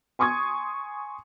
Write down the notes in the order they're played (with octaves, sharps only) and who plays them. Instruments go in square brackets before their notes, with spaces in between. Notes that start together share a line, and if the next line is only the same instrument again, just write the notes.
[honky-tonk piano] G#5 C6 C#6 D#6 G#6